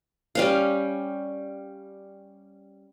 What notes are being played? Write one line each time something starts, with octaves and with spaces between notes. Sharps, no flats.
G3 C#4 F5